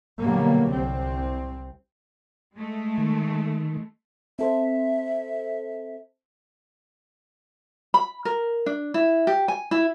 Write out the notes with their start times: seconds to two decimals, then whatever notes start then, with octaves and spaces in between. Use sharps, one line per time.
0.20 B2 D3 F#3 G3 A#3
0.72 C2 C4
2.56 G#3 A3
2.98 D#3
4.39 C4 A4 C5 E5
7.94 B5
8.25 A#4
8.66 D4
8.94 E4
9.27 G4
9.48 G#5
9.71 E4